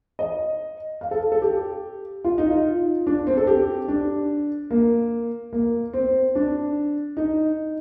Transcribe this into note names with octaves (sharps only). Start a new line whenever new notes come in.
D#5
F5
A4
A4
G4
F4
D#4
F4
D4
C4
A4
G4
D4
A#3
A#3
C4
D4
D#4